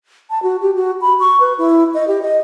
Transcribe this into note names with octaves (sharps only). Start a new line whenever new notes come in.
A5
F#4
G4
F#4
B5
C#6
B4
E4
D#5
G4
D#5